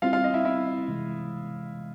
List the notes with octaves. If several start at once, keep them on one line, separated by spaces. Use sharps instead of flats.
G3 C4 E4 F4 F5
F4 F5
D#5
E4 E5
E4 E5
C3 E3 G#3